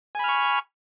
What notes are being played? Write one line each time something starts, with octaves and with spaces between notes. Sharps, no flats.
G#5 B5 C#6 F6